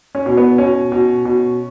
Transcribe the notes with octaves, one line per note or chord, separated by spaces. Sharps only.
C#4
B2
B3
B2 C#4
B2
B2